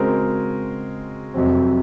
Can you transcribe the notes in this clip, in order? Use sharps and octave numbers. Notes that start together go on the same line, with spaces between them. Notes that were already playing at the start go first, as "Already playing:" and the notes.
Already playing: C#3 G#3 C4 F#4 A#4
F2 C3 F#3 C4